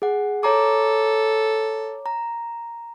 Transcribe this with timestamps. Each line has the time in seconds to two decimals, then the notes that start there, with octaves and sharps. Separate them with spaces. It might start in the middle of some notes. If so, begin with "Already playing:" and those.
0.02 G#4 F#5
0.43 A4 C#5 A#5 D6
2.06 A#5